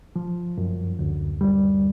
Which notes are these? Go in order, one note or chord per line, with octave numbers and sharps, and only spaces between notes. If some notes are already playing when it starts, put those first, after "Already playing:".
F3
F#2
D2
G3